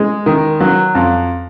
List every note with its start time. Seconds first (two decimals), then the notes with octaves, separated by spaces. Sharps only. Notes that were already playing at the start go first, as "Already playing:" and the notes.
Already playing: G#3
0.26 D#3
0.60 F#3
0.95 F2